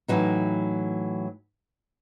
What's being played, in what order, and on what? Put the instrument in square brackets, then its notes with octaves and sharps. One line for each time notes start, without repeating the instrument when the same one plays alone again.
[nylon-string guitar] A2 E3 F#3 D#4